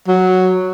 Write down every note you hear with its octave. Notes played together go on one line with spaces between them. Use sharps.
F#3